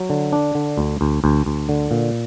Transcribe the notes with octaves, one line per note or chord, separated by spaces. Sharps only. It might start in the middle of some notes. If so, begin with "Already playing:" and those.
Already playing: F#3
D3
D4
D3
D2
D2
D2
D2
D3
A#2